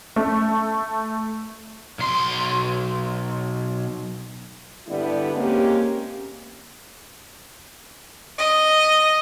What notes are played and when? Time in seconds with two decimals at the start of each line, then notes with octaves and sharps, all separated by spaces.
0.16 A3
1.99 B1 C6
4.88 G2 D3 G3 B3 E4 D5
5.35 G#3 A#3 C4 C#4 G4
8.38 D#5